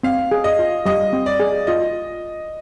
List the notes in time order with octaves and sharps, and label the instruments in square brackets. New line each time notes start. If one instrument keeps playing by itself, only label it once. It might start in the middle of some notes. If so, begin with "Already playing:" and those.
[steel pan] C4 [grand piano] F5
[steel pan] G#4
[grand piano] D#5
[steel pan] F4
[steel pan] G3 [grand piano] D#5
[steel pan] C4
[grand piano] D5
[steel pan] G#4
[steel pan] F4 [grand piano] D#5